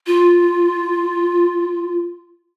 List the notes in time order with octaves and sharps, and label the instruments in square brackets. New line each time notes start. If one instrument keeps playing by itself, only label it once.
[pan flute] F4